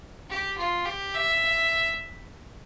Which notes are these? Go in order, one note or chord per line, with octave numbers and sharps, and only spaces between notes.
G4
F4
G4
E5